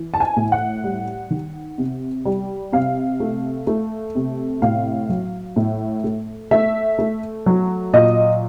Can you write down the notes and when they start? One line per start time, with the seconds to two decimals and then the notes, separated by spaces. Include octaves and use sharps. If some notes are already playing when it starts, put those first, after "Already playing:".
Already playing: E3
0.14 A5
0.20 G#5
0.36 A2
0.52 F#5
0.84 G3
1.30 D#3
1.78 C3
2.25 G3
2.72 C3 F5
3.20 A3
3.67 A3
4.15 C3
4.62 A2 F5
5.09 F#3
5.56 A2
6.04 A3
6.51 A3 E5
6.99 A3
7.46 F#3
7.93 A#2 D#5